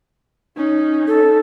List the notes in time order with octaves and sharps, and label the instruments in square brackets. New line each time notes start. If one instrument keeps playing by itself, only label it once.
[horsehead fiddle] C#4 D#4
[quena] A4